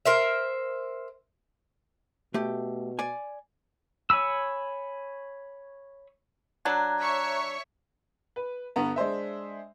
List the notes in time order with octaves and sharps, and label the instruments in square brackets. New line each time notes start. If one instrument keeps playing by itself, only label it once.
[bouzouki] A#4 C5 E5
[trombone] B2 [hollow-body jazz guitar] A3 G4
[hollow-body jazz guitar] D5 G#5
[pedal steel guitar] C#5 G#5 B5 E6
[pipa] F#3 D4 [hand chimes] A#5 F#6 G#6
[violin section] C#5 E5 C#6
[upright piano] B4
G2 D3 B3 A#5
G#3 D4 C5 E5